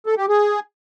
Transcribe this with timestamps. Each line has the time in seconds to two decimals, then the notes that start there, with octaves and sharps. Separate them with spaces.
0.06 A4
0.18 G4
0.29 G#4